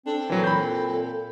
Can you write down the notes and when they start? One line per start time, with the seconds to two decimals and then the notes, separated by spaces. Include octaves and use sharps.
0.06 C4 D4 A4
0.30 A#2 E3 F#3
0.44 A4 B5 G6